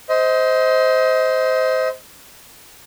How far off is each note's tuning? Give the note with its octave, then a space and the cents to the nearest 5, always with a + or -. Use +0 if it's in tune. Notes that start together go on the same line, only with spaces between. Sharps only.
C5 -10 D#5 +30